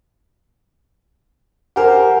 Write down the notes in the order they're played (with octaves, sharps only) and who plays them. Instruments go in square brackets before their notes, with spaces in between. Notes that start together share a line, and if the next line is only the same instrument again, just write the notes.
[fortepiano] G4 A#4 C5 [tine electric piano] F#5 G#5